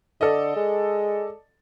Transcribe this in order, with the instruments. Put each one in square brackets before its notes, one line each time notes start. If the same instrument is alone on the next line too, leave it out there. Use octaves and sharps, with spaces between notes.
[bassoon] D3 [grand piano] A4 D5 D#5
[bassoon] G#3